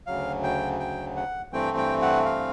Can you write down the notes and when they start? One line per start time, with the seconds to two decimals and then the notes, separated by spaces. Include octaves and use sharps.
0.07 D2 C#3 F#3 F5
0.43 G5
0.80 G5
1.16 F#5
1.53 G2 E3 A3 C4 G5
1.77 G5
2.02 F#5
2.25 F5